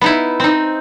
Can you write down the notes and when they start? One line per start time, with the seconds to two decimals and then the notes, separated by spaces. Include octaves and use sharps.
0.01 B3 D#4 E4
0.40 C4 D#4